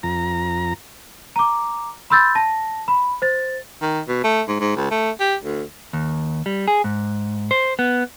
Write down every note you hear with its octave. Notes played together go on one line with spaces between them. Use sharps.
F2 A#5
A#5 D6
B5 C6 E6 G6 A6
A5 A#6
B5
C5 A6
D#3
B2
A3
G#2
G#2
C#2
A3
G4
D2
D#2
G3
G#4
G#2
C5
B3